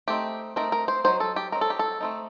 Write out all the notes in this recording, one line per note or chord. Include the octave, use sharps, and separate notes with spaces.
A3 C4 D#4 G4
A3 C4 D#4 A#4
A#4
C5
F#3 C4 D#4 C5
A4
G4
F#3 C4 D#4 A#4
A4
G4
A4
A3 C4 D#4